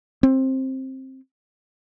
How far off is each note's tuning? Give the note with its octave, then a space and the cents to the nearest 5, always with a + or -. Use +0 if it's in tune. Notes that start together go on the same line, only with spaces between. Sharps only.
C4 +15